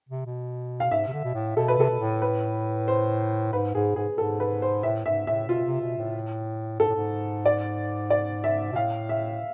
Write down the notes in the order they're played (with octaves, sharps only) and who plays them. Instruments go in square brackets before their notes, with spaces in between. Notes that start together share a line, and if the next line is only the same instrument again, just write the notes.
[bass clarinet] C3
B2
[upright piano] F5
[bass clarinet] G#2 [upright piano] E5
[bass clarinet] C3
D3
B2
A2
[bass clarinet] B2 [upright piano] A4
[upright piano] B4
[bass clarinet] C3 [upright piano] A4
[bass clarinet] B2
A2
[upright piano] B4
C5
[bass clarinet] G#2 [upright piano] B4
[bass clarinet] G#2 [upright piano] G#4
[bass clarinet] G#2 [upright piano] G#4
[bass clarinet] G#2 [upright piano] A4
[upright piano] B4
C5
[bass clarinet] A2 [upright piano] E5
[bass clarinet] G#2 [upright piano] E5
[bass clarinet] A2 [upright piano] E5
[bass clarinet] B2 [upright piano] F4
[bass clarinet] C3
B2
A2
[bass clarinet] G#2 [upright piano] A4
[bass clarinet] A2
G#2
[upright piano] D5
D5
E5
[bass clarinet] B2
[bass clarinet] A2 [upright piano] F5
[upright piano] E5